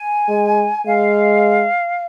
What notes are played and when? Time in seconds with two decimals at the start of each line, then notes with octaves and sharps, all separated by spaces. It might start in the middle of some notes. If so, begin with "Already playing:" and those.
Already playing: G#5
0.29 G#3
0.86 G#3 F5